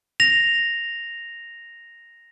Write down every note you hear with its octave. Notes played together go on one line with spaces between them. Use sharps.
A#6 F7